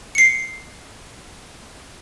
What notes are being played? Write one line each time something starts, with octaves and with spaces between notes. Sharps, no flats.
C7 C#7